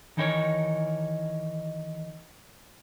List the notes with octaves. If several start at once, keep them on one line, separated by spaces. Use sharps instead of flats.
D#3 E3 D#4 E4 A#4 C#5